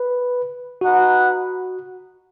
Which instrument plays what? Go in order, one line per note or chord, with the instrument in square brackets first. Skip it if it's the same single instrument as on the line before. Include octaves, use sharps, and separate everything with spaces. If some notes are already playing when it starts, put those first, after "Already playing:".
Already playing: [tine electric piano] B4
[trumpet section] D#4 B4 F#5 [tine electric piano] F#4